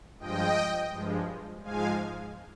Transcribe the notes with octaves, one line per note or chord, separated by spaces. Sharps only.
G2 F3 G#3 D#5 G5
G2 F3 G#3
G#2 F3 G#3 F5 G#5